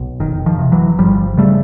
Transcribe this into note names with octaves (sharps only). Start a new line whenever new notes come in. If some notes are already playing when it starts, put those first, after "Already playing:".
Already playing: B1
F1 D#3
D#3 F3
C3
E3 F#3
G1 F3 G3
C#3 G3 A3